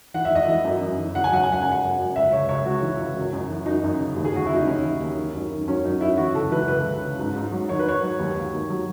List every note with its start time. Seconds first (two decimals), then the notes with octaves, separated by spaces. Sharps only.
0.14 E3 F#5
0.25 E5
0.31 E3 D#5
0.46 E3 E5
0.65 F#2
0.81 F#2
0.98 E3
1.15 C#3 F#5
1.24 G#5
1.32 F#3 F#5
1.43 G#5
1.48 F#2 F#5
1.62 C#3 G#5
1.72 F#5
1.82 F#2
1.99 F#2
2.16 C#2 E5
2.32 C#2 C#5
2.49 C#2 C#5
2.65 C#2 F#4
2.83 E3
2.99 C#2
3.17 F#2
3.33 F#2
3.50 E3
3.66 F#2 D#4
3.83 F#2
4.00 C#3
4.16 D#2
4.25 G#4
4.33 D#2 F#4
4.46 C#3 E4
4.56 D#4
4.67 D#2 C#4
4.83 E3
5.01 D#2
5.17 D#3
5.34 F#2
5.51 D#3
5.68 F#3 C#4
5.84 F#2 D#4
6.01 F#2 E4
6.17 E3 F#4
6.35 C#2 A4
6.51 E3 B4
6.68 C#2 B4
6.85 C#2
7.02 C#3
7.19 G#2
7.36 G#2
7.52 F#3
7.69 D#3 C#5
7.79 B4
7.86 D#3 C#5
8.03 F#3
8.19 D#2
8.36 D#2
8.53 D#2
8.70 F#3